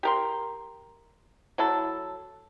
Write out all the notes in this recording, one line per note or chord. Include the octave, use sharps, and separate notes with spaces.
G4 A#4 C6
F#3 E4 A4